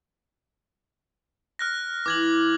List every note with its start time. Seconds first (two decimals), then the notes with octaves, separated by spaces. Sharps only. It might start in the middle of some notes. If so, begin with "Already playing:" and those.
1.59 F6 F#6 A#6
2.06 E3 D6 G#6 F#7